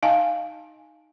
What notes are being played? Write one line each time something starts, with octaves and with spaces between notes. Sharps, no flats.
D#4 D#5 F5 G#5 A5